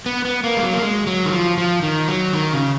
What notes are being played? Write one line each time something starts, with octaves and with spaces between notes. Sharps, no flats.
B3
B3
A#3
G#3
F#3
A#3
G#3
F#3
D#3
F3
F3
D#3
F#3
D#3
C#3